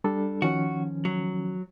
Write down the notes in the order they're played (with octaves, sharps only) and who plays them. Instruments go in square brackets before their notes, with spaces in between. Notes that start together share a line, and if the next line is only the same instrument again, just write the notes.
[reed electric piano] G3 D4 A4
[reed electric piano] D#3 F3 C#4 [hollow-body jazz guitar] F#4
[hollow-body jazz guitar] F#3